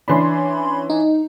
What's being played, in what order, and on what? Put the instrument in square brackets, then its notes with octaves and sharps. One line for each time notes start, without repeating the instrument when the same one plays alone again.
[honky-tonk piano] E3 C#4 D4 [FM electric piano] B5 C6
[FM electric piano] D#4